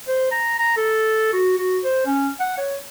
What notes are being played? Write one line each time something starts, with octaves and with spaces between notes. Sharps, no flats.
C5
A#5
A#5
A4
F#4
F#4
C5
C#4
F#5
C#5